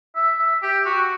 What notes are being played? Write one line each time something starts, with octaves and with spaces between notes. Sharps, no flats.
E5
E5
G4
F#4